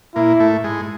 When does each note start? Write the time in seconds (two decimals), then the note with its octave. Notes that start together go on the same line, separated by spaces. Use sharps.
0.15 A#2 A#3 E4
0.40 A2 A3
0.64 G#2 G#3